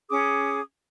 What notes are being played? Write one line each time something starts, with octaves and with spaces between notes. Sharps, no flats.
C#4 G#4 D6 D#6